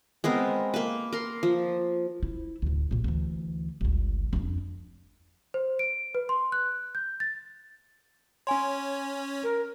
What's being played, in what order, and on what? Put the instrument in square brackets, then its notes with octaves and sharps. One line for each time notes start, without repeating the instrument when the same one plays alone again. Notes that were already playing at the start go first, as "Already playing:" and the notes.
[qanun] G#3 B3 C4 A#4
A#3 B4
A#4 C6
F3
[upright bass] E4
D1 D2
A#1 A#2
D2 E3
G1 C#2
F2 D4
[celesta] C5
D7
B4
C6
F#6
G6
A6
[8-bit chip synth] C#4 C#5 [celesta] G#5 C6
[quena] A#4